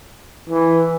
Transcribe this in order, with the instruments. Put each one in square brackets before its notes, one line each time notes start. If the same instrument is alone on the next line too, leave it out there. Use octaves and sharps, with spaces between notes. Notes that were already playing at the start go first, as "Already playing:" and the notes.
[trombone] E3